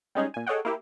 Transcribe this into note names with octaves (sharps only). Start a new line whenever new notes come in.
G3 G#3 C#4 D#4 G#4
A#2 G#5
G#4 A4 C#5 D#5 F#5 G5
A#3 E4 G4